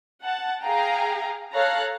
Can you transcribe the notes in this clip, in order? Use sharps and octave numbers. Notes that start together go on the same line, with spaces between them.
F#5 A5
G#4 F5 G5 A#5
A4 C#5 F5 A#5 F#6